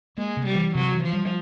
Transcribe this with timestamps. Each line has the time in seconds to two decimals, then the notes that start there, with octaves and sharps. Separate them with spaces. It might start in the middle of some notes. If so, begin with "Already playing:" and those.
0.18 G#3 A#3
0.37 C3
0.46 G3
0.55 E3
0.75 C3 F#3
0.94 E3
1.04 F3
1.13 G3